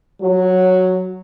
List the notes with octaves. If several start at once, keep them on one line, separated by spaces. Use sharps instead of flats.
F#3